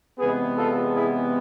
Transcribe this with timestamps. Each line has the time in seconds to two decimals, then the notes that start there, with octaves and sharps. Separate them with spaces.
0.19 E2 C3 G#3 B3 G#4 B4
0.56 F4 A4
0.94 E4 G#4